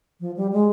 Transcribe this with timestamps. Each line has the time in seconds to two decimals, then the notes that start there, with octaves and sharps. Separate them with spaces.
0.20 F3
0.36 G3
0.52 G#3